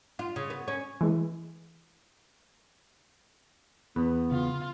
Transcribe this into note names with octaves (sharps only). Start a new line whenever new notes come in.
F4
C#3
B3
C#4
E3 G#3
E2 B3 B4
C#3 F4